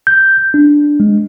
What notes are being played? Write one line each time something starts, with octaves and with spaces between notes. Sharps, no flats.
G6
D4
G#3